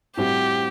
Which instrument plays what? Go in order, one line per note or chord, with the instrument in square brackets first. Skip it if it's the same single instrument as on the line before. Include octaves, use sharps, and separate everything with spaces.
[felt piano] A2 G3 C4 F#4 C5 [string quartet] G4